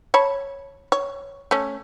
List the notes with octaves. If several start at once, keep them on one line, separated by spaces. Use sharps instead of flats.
C#5 A5 B5
C#5
A3 C#4